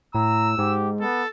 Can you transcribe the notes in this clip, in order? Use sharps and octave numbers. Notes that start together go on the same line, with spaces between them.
A2 A#5 E6
G#2 G4
B3 A4